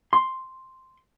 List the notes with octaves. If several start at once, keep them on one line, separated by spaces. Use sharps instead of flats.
C6